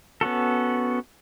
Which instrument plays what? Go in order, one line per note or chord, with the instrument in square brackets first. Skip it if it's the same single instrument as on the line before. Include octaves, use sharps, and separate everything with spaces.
[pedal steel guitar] B3 C#4 F#4 A4